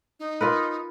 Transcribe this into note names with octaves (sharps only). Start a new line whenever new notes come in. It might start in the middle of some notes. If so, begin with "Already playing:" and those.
D#4
F4 A#4 B4